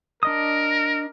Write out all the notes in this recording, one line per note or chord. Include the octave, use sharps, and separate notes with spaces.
D4 A#4 D#5 D#6